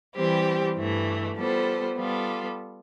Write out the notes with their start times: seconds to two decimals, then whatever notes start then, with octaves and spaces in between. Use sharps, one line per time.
0.14 E3 G3 C4 G4
0.76 G2 E3 A3
1.35 G3 B3 F4 A4 C5
1.96 G3 B3 F4 A4